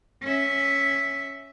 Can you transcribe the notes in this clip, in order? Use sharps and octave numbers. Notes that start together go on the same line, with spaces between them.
C#4 E5